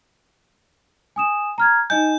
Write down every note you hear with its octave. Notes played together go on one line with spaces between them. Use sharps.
G#5 D#6 E7
A#5 F6 G#6
D#4 D#5 G#5 G6